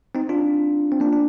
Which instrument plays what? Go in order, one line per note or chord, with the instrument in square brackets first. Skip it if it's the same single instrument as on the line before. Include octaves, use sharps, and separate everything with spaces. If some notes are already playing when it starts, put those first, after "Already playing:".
[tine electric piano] C4 D#4
D4 F4
C4
A#3 D4
D4